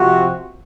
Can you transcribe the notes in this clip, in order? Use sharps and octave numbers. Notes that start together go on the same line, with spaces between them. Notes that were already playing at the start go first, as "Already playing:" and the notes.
Already playing: C3 F3 C4 F#4